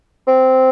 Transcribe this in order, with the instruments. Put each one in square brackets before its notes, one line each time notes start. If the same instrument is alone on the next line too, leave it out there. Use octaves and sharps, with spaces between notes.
[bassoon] C4